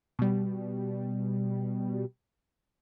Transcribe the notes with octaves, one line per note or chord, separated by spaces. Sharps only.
B2 G3